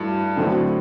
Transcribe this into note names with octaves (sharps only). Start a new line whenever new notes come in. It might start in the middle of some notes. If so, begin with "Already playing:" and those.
Already playing: G2 E3 A3 D4 F#4
A2 D3 F#3 A3 C4 F#4